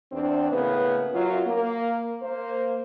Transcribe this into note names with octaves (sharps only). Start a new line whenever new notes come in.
E2 C4 D4
A2 C#3 A#3 B3 B4
F#2 F#3 F4
A#3
A#3 C5